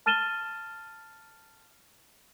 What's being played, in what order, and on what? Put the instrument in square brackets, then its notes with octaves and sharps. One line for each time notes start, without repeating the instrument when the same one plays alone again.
[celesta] A5 F6 A6 D#7 E7 G7